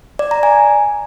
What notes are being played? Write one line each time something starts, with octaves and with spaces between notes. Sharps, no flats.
D5
A#5
G#5